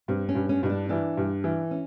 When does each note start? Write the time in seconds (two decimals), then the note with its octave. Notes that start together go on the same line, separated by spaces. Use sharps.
0.08 G2 C4
0.29 C#4
0.35 G2
0.49 C#4
0.63 G2 D#4
0.69 D4
0.89 E3 D4
1.17 G2
1.44 E3
1.71 C#4